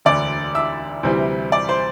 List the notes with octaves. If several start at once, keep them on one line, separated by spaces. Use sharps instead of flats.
E1 D2 D3 D5 D6
E5 E6
D2 C3 E3 G3 C4
D5 D6
C5 C6